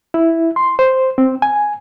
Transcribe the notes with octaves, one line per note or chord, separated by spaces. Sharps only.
E4
C6
C5
C4
G#5